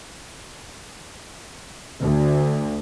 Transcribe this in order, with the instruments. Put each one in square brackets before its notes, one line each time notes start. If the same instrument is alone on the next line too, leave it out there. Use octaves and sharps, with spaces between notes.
[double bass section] D2